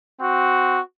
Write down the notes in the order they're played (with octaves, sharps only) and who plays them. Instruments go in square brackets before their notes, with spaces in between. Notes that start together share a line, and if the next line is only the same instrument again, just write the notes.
[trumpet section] C4 F#4